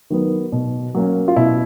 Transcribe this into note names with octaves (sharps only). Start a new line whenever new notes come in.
D#3 F#3 B3
B2
F#3 A#3 C#4
F4
B2 E4